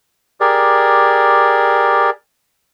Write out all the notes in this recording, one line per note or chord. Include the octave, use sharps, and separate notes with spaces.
G4 G#4 A#4 D5